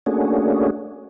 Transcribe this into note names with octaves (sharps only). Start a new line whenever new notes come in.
A3 A#3 C#4 D4 F#4 G#4